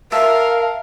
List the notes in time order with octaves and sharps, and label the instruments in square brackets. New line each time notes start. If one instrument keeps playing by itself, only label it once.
[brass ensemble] A#4 [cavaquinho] E5 [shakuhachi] F5 [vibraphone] A5